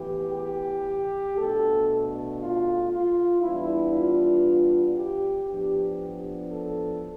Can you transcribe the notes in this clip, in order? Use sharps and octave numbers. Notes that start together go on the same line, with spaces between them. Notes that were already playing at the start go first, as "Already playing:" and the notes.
Already playing: A2 E3 B3 G4
G4
B2 A3 D4 A4
F4
F4
E3 G3 B3 D4 E4
F4
G4
A2 F3 B3 D4 G4
A4